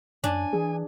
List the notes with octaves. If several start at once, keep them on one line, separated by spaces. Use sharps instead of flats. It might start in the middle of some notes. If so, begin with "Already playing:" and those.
F#2 D4 G#5
E3 G#4